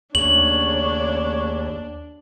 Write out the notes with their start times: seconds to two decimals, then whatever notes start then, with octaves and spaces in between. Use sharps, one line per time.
0.15 D#2 C#3 A3 D4 C#5 F#7